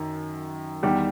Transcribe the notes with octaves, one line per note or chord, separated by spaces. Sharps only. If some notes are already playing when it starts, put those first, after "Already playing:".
Already playing: F#2 D#3
E2 D#3 G3 G4